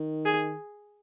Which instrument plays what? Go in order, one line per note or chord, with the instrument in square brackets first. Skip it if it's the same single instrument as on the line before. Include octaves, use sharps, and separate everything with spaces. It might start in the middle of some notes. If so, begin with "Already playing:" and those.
Already playing: [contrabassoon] D#3
[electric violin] G#4